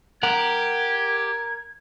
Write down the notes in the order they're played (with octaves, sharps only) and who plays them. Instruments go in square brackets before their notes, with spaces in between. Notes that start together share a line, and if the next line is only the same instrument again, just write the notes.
[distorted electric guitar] G4 [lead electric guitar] A#4 F#5 [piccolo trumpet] G#6